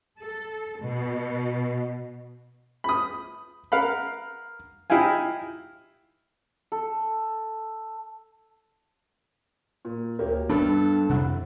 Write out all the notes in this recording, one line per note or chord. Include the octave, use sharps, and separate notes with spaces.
A4
B2
B5 D#6
A#4 F5 F#5 B5
D#4 E4 G4 F5 G#5
A4
A#2
D2 A#3 G4 C#5
G2 G3 B3 D4 A4
F2 C3 E4 F#5